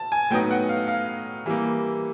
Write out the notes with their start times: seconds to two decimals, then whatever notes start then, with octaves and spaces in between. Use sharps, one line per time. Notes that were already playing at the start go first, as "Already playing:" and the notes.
Already playing: A5
0.12 G#5
0.30 A2 F#3 B3 D#4 G5
0.51 F#5
0.69 F5
0.88 F5
1.46 E3 G3 A#3